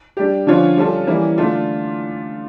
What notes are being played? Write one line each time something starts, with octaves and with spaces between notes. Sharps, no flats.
G3 D4 G4
D3 F3 C#4 F4 C#5
G3 C#4 F4 A4
E3 G3 A#3 C#4 E4
D3 A3 D4 F4